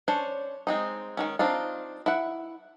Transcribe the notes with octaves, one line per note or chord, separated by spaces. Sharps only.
C#4 D4 C5 C#5
G#3 C4 D#4
D#3 G#3 C#4
C4 D4 D#4 F4
E4 F#5